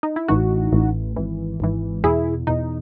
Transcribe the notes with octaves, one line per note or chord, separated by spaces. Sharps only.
D#4
E4
A1 A2 E3 D#4 F#4
A1 A2 E3
G#1 G#2 E3
G#1 G#2 E3
E2 B2 E4 G#4
E2 B2 D#4